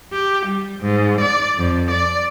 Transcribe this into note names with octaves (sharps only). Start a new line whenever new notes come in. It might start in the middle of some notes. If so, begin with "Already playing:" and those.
G4
G3
G#2
D5
F2
D5